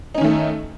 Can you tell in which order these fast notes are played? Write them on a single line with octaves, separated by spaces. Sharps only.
D#4 C#4 D#3 A3